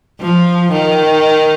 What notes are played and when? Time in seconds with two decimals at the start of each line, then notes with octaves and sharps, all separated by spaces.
0.21 F3
0.71 D#3